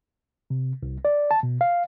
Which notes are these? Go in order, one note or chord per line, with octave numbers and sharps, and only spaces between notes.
C3
C2
D5
A5
B2
F5